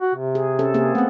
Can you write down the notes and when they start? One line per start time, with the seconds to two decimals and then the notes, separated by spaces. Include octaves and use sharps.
0.01 F#4
0.15 C3
0.35 G#4
0.59 C#4 A4
0.74 A#3 C4 G#4
0.95 A3 B3 C4